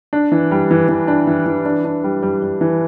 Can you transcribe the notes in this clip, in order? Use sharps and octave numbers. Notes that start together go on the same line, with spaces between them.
D4
E3
G3
E3
E3
D4
E3
E3
D4
D4
G3
G3
G3
E3